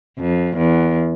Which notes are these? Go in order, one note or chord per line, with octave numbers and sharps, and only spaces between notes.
F2
E2